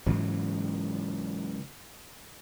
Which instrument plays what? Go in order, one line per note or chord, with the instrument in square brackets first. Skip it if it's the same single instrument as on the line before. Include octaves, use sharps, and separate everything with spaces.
[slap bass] G#2 C#3 E3 F#3